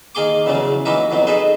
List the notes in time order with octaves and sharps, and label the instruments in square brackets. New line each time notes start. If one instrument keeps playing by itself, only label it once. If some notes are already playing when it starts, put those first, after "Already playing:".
[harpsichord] D#3 A#3 G#4 C6 D6
E2 C#3 F3 F#3
E3 F#3 A#3 D#4 E4
F2 B2 F#3
D#4 G#4 A4 B4 C5